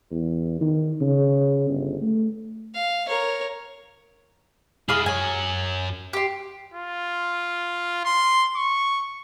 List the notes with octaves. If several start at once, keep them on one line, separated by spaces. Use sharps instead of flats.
E2
D#3
C#3
G1
A3
F5
A#4 C#5
G#3 E4 G#4 F5 D#6
F#2 C#5 G#5
G4 C6
F4
C6
C#6